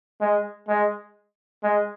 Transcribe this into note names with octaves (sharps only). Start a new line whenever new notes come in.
G#3
G#3
G#3